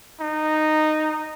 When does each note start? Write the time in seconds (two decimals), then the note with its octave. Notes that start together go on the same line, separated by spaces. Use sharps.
0.21 D#4